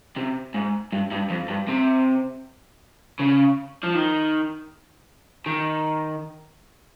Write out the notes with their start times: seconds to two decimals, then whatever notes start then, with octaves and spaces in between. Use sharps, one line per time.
0.17 C3
0.55 G#2
0.92 G2
1.11 G2
1.30 F2
1.49 G2
1.69 C3
3.19 C#3
3.83 F3
3.95 D#3
5.46 D#3